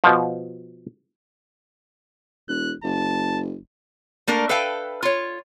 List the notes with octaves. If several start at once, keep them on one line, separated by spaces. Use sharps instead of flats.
B2 F3
E1 F#6
F#1 A5
A3 A#3 D4 A#4
A4 B4 E5 F5 G5
F4 C#5